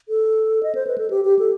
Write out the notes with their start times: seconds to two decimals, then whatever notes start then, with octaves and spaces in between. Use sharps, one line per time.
0.09 A4
0.63 D#5
0.75 C5
0.87 B4
0.98 A4
1.10 G4
1.25 G4
1.39 A4